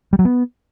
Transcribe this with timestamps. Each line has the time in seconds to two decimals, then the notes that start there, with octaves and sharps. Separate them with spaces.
0.13 G3
0.19 F#3
0.25 B3